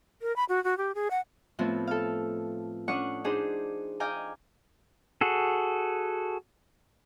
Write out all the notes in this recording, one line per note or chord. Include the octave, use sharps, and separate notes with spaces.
A#4
B5
F#4
F#4
G4
G#4
F#5
A2 F3 B3 C4
A4 F5
C#4 D4 F#5 C#6 D#6
D4 D#4 G#4 C5
D#5 F5 G5 G#5 A#5 D6
F#4 G#4 A4